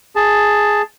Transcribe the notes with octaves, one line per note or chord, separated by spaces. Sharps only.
G#4 A5